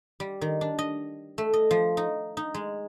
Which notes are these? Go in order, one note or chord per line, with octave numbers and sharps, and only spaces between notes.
G3
D#3
D4
D#5
A3
D#5
F3
D#4
D#4
G#3